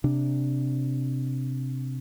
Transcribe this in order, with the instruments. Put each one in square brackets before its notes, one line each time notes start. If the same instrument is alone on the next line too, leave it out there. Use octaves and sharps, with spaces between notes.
[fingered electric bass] C3 D4